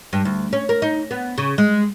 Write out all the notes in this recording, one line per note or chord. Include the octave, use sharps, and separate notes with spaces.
G2
D2
C#4
A#4
D#4
B3
C#3
G#3